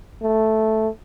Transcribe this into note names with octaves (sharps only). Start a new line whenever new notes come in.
A3